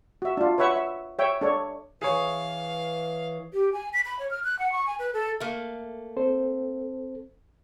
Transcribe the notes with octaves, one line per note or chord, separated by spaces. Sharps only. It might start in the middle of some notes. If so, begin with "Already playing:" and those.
F#4 E5
D4 F4
B4 C#5 E5 F#5 C#6
E5
C#5 E5 G5
D4 A4 C#5
E3 G#4 C#5 F5
G4
G#5
B6
B5
C#5
F6
F#6
F#5
C#6
G#5
B4
A4
A3 A#3
C4 A4 C5